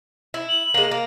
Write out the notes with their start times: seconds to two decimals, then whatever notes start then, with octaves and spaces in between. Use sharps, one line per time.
0.34 E4
0.49 F#7
0.74 G#3 A#3
0.91 A#3